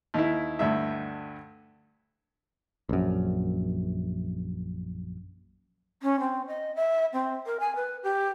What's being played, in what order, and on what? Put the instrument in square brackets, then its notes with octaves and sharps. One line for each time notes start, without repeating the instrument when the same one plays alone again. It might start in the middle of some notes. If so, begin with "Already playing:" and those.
[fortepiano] D#2 E4
D2 G2 E5
[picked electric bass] A#1 F#2
[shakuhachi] C#4
C4
D#5
E5
C4
A#4
G#5
B4
G4